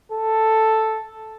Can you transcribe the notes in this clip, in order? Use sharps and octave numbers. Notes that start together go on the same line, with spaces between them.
A4